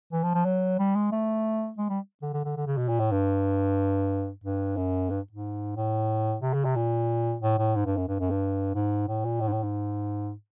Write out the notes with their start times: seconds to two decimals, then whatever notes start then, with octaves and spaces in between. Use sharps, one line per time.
0.12 E3
0.24 F3
0.35 F3
0.45 F#3
0.79 G3
0.95 G#3
1.12 A3
1.78 G#3
1.89 G3
2.22 D3
2.34 D3
2.45 D3
2.56 D3
2.67 C#3
2.77 B2
2.89 A#2
3.00 A2
3.12 G2
4.44 G2
4.77 F#2
5.10 G2
5.33 G#2
5.77 A2
6.42 C3
6.54 C#3
6.65 C3
6.76 A#2
7.42 A2
7.59 A2
7.75 G#2
7.86 G2
7.97 F#2
8.08 G2
8.20 F#2
8.30 G2
8.75 G#2
9.08 A2
9.25 A#2
9.41 A2
9.48 G#2
9.53 A2
9.63 G#2